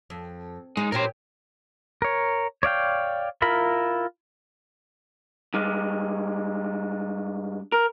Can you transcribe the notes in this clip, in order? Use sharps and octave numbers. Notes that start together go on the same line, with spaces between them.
F2
G#3 D#4
A#2 C#4 G4 A#4 C5
A#4 C#5
C#5 D5 F5 G5
E4 F4 A#4 B5
G2 G#3
A#4